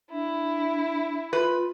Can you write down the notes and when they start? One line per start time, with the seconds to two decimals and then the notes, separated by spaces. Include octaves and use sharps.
0.11 D4 E4
1.33 F4 B4